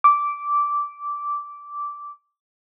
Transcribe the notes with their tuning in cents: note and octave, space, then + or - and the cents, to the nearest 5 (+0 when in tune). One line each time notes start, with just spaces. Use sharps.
D6 -10